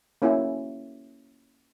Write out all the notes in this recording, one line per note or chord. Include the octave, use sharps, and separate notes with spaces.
A#3 C#4 E4 F#4